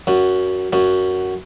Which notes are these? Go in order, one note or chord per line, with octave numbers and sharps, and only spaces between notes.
F#2 F#3
F#2 F#3